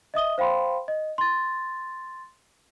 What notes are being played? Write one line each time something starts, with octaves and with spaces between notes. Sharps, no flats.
D#5 E5 D#6 G7
C5 F5 G5 B5 C6
D#5
C6 A6